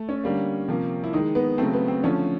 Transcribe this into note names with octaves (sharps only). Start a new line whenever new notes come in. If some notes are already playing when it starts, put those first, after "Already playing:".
Already playing: A3
C#4
D3 G3 A#3
C3 F3 A#3
E4
D#3 G#3 D#4
B3
C#3 F#3 A3 C4
B3
C4
D3 F3 A3 C#4